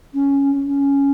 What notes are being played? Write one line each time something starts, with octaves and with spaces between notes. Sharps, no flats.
C#4
C#4